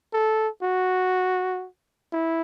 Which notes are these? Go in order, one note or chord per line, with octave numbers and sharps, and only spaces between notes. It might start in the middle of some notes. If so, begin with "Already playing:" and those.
A4
F#4
E4